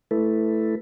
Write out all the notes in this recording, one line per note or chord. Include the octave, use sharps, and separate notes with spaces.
A3 E4 A4 B4